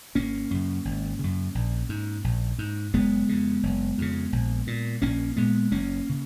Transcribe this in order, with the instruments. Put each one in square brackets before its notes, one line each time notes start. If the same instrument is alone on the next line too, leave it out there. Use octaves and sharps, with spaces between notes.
[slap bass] G#1 A#3 C#4
F#2 C#3
G#1
F#2 C#3
A#1
G#2
A#1
G#2
F#1 G#3 B3
F2 C#3
F#1
F2 C#3
A#1
A#2
A#1 A#3 C#4
A#2 G#3 B3
F#1 A#3 C#4
C#3